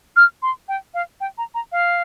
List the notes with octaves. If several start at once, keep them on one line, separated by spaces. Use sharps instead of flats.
F6
C6
G5
F5
G5
A#5
A#5
F5